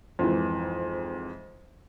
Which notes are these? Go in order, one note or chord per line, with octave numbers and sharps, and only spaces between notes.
F2 G#2 E3